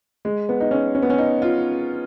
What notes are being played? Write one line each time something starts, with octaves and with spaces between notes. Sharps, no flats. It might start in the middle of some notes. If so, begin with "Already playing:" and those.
G#3
B3
D#4
C#4
C#4
B3
C#4
D#4
F4